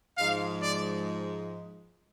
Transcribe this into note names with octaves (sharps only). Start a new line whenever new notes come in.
G#2 F3 G#3 F5
D5